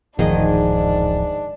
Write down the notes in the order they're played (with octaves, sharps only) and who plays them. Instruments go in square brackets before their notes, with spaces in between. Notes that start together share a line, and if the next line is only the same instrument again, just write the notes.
[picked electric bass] D1 A1 F3 [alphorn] G#2 [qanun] D#3 G#4 D#5 [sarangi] D4